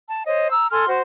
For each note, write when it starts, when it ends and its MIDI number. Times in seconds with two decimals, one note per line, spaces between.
0.09 0.24 81
0.25 0.50 72
0.25 0.50 73
0.25 0.50 75
0.51 0.66 82
0.51 0.66 88
0.70 0.85 69
0.70 0.85 80
0.70 0.85 84
0.70 0.85 89
0.87 1.01 66
0.87 1.01 72